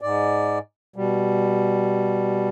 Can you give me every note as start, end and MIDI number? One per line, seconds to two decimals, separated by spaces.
0.01 0.59 44
0.01 0.59 74
0.96 2.49 47
0.96 2.49 55